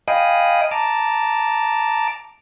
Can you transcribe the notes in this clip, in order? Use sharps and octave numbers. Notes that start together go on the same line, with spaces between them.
D#5 F5 G5 G#5 B5 D#6
A5 A#5 D6